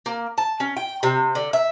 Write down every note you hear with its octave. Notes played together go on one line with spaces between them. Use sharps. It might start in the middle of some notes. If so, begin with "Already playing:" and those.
A#3
A5
C#4
G5
C3
D3
E5